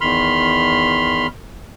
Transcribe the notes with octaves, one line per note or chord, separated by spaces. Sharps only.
E2 D#3 B5 C6 F6